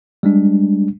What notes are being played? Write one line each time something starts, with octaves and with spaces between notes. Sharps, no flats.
G3 G#3 D4